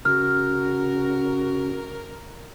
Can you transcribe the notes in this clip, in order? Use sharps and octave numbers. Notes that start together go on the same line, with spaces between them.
C#3 F#4 A#4 F6